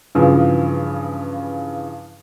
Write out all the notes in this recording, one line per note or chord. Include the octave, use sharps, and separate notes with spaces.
G2 C#3 E3 F3